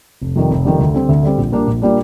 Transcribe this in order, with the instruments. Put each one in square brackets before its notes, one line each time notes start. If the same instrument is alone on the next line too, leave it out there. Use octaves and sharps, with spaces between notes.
[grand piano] F1
F2 C3 D#3 G3
F1
F2 C3 D#3 G3
D2
D3 G3 C4
D2
D3 G3 C4
A#1
A#2 G3 A#3 D4
A#1
A#2 G3 A#3 D4